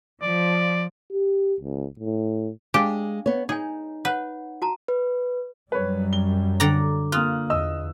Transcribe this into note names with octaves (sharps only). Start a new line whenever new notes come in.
F3 D5
G4
C#2
A2
G#3 D4 G4 F5 G#5
B3 C#5
D#4 G#4 C#5 G#5
B4 C#5 F#5
F#4 A5 A#5
B4
F#2 F#3 G3 B4 C#5
G7
D3 D5 A#5
A#3 F4 D#6 F#6
E2 D#5 D#6 E6